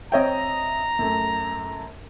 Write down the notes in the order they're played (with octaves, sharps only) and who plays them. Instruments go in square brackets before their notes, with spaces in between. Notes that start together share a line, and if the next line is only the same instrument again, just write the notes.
[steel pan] C4 C#5 G5 [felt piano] D#5 E5 [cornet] A#5
[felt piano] F#2 A3